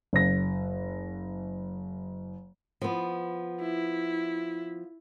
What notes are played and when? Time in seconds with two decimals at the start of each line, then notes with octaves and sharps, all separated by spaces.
0.13 F#1 A#6
2.81 F3 B3
3.61 E4